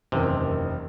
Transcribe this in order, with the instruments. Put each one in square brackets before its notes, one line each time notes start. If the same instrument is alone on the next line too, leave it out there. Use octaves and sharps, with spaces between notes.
[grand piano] F#1 E2 D#3 [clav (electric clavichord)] C3